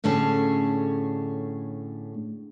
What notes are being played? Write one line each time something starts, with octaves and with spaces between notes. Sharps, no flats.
A2 D3 A3 C#4 G#4 A5